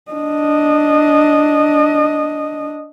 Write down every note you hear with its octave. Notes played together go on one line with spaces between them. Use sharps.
D4 D#5